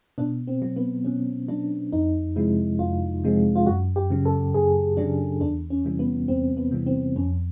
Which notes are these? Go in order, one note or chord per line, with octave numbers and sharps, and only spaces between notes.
B2 D4
C4
F#3
B3
B2 C#4
F#3 D4
F2 D#4
C3 F3 G#3 E4
F2 F4
C3 F3 G#3
F4
F#2 F#4
G4
C#3 F#3
A4
F#2 G#4
C#3 F#3 D4
E2 D4
C#4
C3 E3 G3
B3
E2 C4
B3
C3 E3 G3
C4
F2 C#4